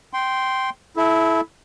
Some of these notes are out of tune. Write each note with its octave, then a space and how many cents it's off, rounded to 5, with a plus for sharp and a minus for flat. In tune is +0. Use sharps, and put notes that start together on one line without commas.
G5 -10 C6 +0
E4 +0 A4 -30